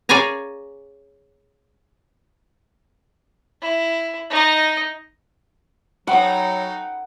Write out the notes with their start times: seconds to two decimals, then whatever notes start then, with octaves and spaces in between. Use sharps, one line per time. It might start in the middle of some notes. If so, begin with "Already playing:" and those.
0.09 G#4 C#5 D5 F5 G#5 A#5
3.61 E4
4.30 D#4 D#5
6.07 F#3 D#4 A4 F#5 G5 A#5 B5